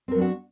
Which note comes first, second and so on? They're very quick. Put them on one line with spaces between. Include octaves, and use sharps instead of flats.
C4 A#4 F#3 D4 F#4